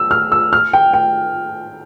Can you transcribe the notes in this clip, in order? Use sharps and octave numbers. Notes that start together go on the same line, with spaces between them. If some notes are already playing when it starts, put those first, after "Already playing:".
Already playing: E6
F6
E6
F6
G5
G5